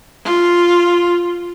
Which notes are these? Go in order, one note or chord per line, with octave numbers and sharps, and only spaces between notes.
F4